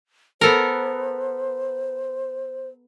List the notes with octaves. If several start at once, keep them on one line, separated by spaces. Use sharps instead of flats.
B3 A4 A#4 C5